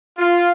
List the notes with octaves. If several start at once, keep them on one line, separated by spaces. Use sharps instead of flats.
F4